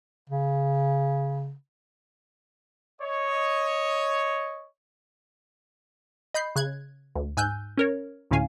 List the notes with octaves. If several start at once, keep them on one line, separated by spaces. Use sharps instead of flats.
C#3
C#5 D#5
D#5 B5 G6 C7
C#3 F#6 G#6
D2
G#2 G#5 E6 F#6 G6
C#4 A#4 C#5
D2 A2 D3 C#4 F5 G#5